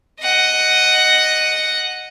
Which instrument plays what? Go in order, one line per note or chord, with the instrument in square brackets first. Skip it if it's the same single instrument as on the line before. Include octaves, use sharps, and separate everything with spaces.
[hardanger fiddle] D#5 F#5